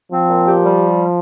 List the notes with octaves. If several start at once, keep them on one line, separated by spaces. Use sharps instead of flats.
F3 C4
A#2
G4
G3